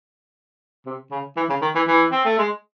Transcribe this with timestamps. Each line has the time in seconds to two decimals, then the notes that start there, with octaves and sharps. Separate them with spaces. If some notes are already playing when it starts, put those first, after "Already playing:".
0.86 C3
1.11 C#3
1.37 E3
1.49 C#3
1.62 D#3
1.75 E3
1.88 E3
2.12 C4
2.25 A3
2.38 G#3